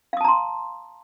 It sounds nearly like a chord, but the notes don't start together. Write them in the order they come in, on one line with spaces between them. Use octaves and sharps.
F5 D#6 A5 A#5 C6